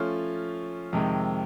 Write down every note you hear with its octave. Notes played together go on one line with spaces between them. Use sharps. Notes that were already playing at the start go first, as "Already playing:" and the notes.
Already playing: F3 A3 C#4 F4
F2 C3 D#3 G#3